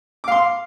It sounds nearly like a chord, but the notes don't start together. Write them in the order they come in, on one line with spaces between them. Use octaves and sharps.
D6 F5 C6